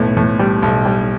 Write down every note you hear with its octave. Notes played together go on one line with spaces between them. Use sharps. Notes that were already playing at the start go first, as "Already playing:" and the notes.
Already playing: B1 A2 B3
A2
G3
B1
G3